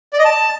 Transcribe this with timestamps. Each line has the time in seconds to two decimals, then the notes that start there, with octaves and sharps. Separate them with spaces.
0.13 D5
0.19 D#5
0.25 A5